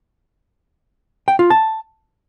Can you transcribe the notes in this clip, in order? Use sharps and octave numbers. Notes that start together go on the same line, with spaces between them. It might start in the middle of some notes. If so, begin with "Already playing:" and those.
G5
F4
A5